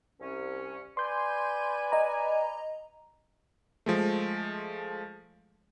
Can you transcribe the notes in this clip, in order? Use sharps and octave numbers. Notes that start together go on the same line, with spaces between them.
C2 C#4
B4 D5 G#5 C6 G6
D#5 A#5
F3 G#3 A3